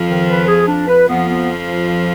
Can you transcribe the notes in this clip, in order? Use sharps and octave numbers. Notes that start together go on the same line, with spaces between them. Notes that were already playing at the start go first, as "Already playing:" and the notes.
Already playing: F2 F3
D#3
B4
G#4
D4
B4
F2 F3 B3
B3